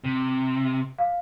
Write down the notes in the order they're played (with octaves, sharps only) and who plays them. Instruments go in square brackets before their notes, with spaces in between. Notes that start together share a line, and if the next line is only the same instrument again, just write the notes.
[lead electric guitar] C3
[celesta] F5